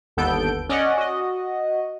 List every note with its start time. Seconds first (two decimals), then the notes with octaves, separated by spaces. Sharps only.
0.17 G1 D#2 B3 A4 G6 D7
0.69 C#4 D5 D#5 F#5
0.97 F#4 D#5